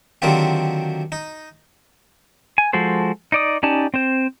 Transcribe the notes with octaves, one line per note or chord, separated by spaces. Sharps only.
D3 D#3 F#3 C4 F4 G4
D#4
G#5
F3 G#3 F#4 A4 C5
D#4 D5 D#6
C#4 D#4 G4 D5 A5
C4 C5